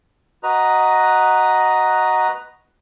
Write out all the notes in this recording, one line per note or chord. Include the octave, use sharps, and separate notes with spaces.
F#4 B4 D#5 A#5